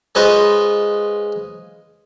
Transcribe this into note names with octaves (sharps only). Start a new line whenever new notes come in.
G#3 C#4 F4 B4 C5 D#5